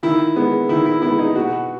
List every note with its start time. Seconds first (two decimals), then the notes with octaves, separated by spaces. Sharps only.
0.03 D#3 E4
0.36 G#3 B3
0.69 D#3 E4
0.86 E4
1.02 G#3 B3 E4
1.19 D#4
1.35 B2 F#4